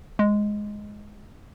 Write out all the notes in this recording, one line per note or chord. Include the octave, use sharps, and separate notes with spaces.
G#3